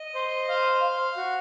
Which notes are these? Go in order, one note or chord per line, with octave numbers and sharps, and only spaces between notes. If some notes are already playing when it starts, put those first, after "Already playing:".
Already playing: D#5
C5
F5
F5
F#4